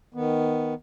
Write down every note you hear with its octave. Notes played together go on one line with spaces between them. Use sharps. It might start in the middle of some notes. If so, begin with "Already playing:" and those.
D#3 B3